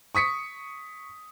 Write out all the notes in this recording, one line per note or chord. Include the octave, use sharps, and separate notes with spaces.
C#6 D#6 B6 C#7